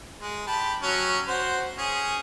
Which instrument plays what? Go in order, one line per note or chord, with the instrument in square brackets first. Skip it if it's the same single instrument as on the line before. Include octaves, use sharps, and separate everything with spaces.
[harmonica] G#3
G4 A5 B5
F#3 C#4
F#4 C5
C#4 G#4